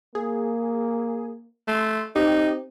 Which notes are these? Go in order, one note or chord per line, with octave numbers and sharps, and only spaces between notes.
A#3 G#4
A3 C6
C4 D#4 G4